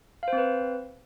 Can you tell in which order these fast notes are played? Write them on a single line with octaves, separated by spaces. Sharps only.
F5 C5 C4 B4